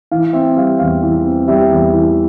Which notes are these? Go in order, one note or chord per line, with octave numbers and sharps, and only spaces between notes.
E3 F5
C4 E5
G3 F5
E2 F5
E3
C4
G3 E5
E2
E3